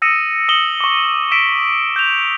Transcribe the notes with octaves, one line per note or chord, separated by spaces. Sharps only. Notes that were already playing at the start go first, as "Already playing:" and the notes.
D#6 E6 A#6 C#7 D#7 E7
D#6 C#7 E7 F#7 G7
C#6 D6
E6 B6 D7 E7
G6 F7